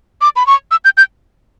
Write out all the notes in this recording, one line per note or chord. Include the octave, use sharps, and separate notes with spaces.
D6
B5
C#6
E6
G6
G6